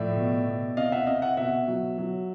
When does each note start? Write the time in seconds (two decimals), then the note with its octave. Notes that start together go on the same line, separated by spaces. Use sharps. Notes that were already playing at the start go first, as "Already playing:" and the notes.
Already playing: A2 F3 D5 E5
0.16 B2
0.46 B2
0.77 C3 D#5 F5
0.92 E5 F#5
1.06 C3 D#5 F5
1.22 E5 F#5
1.37 B2 E5 F#5
1.68 F#3
1.98 F#3